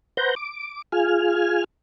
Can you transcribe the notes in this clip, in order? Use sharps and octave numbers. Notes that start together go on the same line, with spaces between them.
B4 C5 F#5 A#5 G6
D6
F4 G#4 G#5 F6